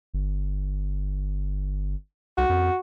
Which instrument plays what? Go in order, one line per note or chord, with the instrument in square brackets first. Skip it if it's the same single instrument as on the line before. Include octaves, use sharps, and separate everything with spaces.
[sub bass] G1
[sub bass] C2 [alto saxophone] F#4
[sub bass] F2